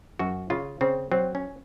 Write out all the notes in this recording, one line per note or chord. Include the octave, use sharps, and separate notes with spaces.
F#2 F#4
C#3 F4
C#3 C4
F#3 C4
C#4